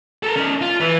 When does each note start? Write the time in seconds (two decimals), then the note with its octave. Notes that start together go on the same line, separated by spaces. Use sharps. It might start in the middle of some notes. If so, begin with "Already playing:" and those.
0.23 A4 A#4
0.36 C#4 D#4
0.61 F4
0.80 E3 B4